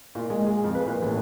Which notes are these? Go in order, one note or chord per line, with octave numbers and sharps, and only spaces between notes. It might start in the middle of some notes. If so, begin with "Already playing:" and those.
A#2
G#3
G#4
F2
B4
A#2
A1